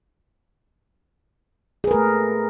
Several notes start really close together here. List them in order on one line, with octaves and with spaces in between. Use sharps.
G#4 B4 A#4 A3